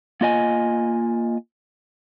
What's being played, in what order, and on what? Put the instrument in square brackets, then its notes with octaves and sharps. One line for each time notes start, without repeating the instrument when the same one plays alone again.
[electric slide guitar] A#3 F4 D#5 G#5